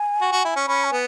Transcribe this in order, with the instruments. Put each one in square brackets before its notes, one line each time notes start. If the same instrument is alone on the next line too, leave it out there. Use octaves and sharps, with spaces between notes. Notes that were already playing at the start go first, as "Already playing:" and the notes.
Already playing: [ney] G#5
[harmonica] F#4
F#4
E4
C#4
[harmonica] C#4 [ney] B5
[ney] G#5
[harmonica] B3